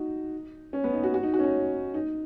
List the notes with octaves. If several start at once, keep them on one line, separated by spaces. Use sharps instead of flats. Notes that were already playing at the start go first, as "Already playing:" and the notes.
Already playing: D#4 F#4
C#4
B3
D#4
F#4
F#4
D#4
F#4
C#4
D#4
D#4